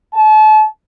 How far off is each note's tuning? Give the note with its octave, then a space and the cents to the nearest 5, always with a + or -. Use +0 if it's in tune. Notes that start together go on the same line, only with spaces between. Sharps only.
A5 -35